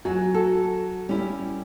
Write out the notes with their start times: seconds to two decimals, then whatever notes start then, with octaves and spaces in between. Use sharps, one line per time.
0.05 F#3 F#4 G#5
0.34 F#4 A4
1.09 G3 C#4 E4